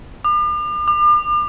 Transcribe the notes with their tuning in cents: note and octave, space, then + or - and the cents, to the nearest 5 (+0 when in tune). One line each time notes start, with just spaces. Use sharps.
D6 +45
D6 +40